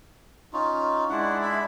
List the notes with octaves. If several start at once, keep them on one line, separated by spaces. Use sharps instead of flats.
C#4 D#4 F4
G#3 D4 E4 F#5
E5 B5